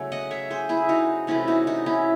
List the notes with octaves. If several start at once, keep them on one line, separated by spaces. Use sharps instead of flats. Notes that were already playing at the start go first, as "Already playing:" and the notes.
Already playing: C#3 F#3 A3 C#5
D#5 F#5
C#5 E5
G#4 C5
E4 G#4
D#4 F#4
C3 E3 A3 C#4 E4
D#4 F#4
D#4 F#4
C#4 E4